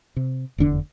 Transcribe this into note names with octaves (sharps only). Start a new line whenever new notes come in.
C3
F1 E2 D3 D4